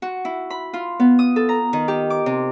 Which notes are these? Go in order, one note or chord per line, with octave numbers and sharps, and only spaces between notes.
F#4
E4
B5
F4
B3
D#6
A4
A#5
D#3
G4
D6
C3